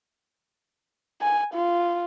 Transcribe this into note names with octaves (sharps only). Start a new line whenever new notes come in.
G#5
F4